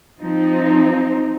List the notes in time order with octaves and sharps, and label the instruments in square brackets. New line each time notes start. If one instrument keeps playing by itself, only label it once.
[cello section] F3 C4 D#4